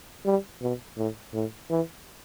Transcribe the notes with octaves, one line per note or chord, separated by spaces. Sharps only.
G3
B2
A2
A2
E3